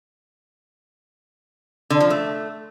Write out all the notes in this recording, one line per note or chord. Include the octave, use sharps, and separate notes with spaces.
D3
F3
A3